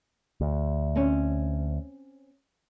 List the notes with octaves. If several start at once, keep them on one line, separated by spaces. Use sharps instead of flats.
D2
C4 C#4